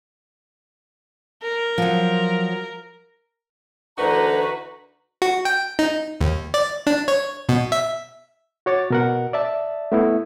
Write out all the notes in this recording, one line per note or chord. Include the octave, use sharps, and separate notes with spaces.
A#4
F3 F#3
D2 D3 E3 D#4 F#4 A#4 B4 A#5
F#4
G5
D#4
D#2
D5
D4
C#5
B2
E5
F#4 C#5 D6 A6
B2 A#4 F#5
D5 E5 A5
A3 B3 E4